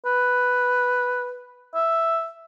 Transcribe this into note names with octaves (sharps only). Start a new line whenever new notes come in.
B4
E5